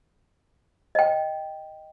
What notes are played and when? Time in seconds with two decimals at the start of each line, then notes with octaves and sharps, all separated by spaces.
0.95 D#5 G5